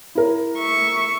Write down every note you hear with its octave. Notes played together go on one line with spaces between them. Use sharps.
E4 A#4
E5 C#6